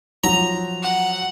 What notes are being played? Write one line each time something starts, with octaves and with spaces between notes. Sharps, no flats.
F3 F#3 A#5
F#5